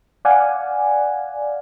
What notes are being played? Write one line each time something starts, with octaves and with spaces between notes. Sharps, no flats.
D5 F5 F#5 G#5